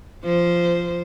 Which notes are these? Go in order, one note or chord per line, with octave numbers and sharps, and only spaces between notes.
F3 C5